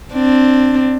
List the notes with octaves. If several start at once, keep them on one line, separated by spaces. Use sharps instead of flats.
C4 D4